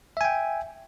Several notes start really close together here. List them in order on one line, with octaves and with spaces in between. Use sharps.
E5 G#5 G5